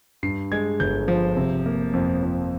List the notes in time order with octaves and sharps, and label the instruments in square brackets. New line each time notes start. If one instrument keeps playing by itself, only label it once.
[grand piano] G2 C7
G#3 G#6
G1 G6
F3
C3
A#3
F2
F3